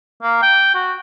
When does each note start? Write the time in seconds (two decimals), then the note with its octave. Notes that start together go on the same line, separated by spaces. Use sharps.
0.23 A#3
0.42 G5
0.75 F#4